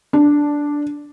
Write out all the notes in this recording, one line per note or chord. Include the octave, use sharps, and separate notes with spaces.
D4